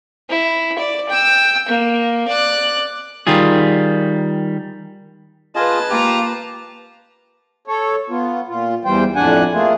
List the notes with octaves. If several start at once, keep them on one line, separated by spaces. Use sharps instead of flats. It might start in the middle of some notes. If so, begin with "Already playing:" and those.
E4
D5
G5 E6
A#3
D5 F#6
D#3 G3 F4 G#4
F4 G#4 B4 D#5 A5
A#3 F4 G4 A#5
A4 C#5
B3 F4
A#2 F4
E2 E3 G3 C5 G5
F2 A2 D4 F#5 G#5
A3 A#3 F4 G#4